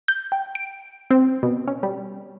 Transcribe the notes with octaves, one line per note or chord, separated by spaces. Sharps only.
G6
G5
D7
C4
B2
C#4
G3